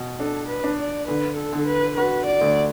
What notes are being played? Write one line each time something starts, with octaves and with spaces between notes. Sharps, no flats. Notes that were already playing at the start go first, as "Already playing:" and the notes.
Already playing: B2
D4 A4
B4
D4
D5
D3 B4
A4
D3
B4
F#4 B4
D5
D2